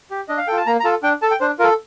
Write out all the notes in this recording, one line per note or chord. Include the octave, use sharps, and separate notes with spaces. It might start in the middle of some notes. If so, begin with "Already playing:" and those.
G4
D4 D#5
F5
F4 A4 G5
A5
A#3 A#5
A#5
F4 A4 A5
D4 G5
A4 A5
G5
D4 C5
F4 A4 A#4